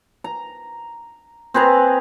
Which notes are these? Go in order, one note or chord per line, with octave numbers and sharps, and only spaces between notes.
A#5
C4 G#4 B4 A#5